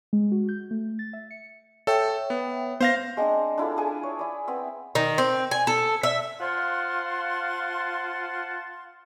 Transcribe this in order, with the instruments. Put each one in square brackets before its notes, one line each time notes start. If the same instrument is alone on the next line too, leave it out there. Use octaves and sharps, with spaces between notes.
[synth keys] G#3
F#4
G6
A3
A6
E5
C#7
[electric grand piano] A4 [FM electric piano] C#5 E5 G5
[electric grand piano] B3
[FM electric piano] B3 [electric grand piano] C5 F5 A#6
[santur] G#3 C4 D4
D4 E4 F4 A4
D4 G#4 G#5
C#5
E4 D5
B3 C4 E5
[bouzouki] D#3
C4
G#5
A4
E5
[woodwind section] F4 C5 F5 F#5 A5 C6